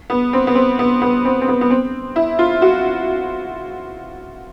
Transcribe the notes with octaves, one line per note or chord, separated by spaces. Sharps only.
B3
C4
B3
C4
B3
B3
C4
C4
B3
B3
C4
E4
F4
F#4